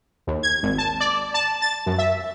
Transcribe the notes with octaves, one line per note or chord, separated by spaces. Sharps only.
D#2
G#6
G#1
A5
D5
A5
A6
F#2
E5